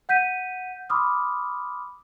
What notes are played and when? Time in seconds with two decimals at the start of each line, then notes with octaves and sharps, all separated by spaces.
0.09 F#5 G6 B6 D#7
0.90 B5 C6 D6 D#6 F6